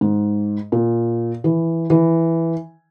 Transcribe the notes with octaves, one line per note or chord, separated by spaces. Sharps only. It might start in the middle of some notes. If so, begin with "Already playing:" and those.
G#2
A#2
E3
E3